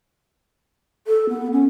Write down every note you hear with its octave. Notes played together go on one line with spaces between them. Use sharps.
A4
B3
C#4